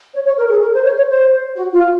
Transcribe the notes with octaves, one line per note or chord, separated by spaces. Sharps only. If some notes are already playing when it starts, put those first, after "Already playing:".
C#5
C#5
A#4
G#4
A#4
C5
C#5
C#5
C5
F#4
F4